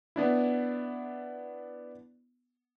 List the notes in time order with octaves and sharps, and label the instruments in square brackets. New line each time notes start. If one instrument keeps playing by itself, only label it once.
[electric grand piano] B3 D4 E4